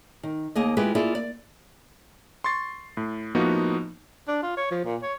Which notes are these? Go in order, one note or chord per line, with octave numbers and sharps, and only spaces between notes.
D#3
D#2 A#3 G#4 D#5
G#3 E4 F4 G4 G#4 B4
A#3 E4 F4 G#4 D5
D5
C6 C#6 A6 C7
A2
A2 F3 A#3 B3 D#4 F#4
D4
F4
C#5
F3
A#2
C#5